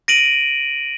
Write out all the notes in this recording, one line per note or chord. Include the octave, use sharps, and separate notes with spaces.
A#6 D7 D#7 F#7